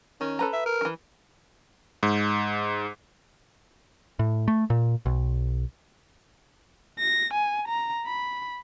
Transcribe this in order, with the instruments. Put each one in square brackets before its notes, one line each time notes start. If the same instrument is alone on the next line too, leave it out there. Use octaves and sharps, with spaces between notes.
[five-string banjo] D#3 [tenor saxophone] C#4
[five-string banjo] A4 B4 A#5
[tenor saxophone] E5
A#4
[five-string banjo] D#3 E3
[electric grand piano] G#2
[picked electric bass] A2
A3
A#2
B1
[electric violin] A#6
G#5
A#5
B5